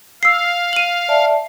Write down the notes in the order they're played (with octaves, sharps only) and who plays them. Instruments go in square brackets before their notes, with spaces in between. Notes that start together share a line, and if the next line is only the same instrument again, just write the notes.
[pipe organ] F5 [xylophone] E6 C7
[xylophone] D#7 F#7
[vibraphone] D5 E5 A5